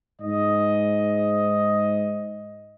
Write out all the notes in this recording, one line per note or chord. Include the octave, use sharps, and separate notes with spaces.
G#2 D#5